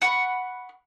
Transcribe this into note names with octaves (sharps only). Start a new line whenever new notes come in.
F#5 B5 C#6